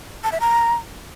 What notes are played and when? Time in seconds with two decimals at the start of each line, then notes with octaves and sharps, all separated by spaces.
0.24 A5
0.32 E5
0.40 A#5